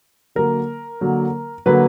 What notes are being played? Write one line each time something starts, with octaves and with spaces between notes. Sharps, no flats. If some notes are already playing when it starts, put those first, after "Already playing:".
D3 F#3 A#3 A#4
D3 F#3 A#3
D3 F#3 A#3 B4